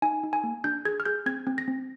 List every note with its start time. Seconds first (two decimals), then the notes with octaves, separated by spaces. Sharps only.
0.02 D#4 G#5
0.23 D#4
0.33 G#5
0.44 A#3
0.64 D4 G6
0.85 G#4 G#6
1.00 F6
1.05 G#4 G6
1.26 C4 G#6
1.47 C4
1.58 A#6
1.68 C4